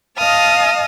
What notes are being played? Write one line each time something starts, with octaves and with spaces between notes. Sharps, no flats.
D#5 F5 A5 D#6 F6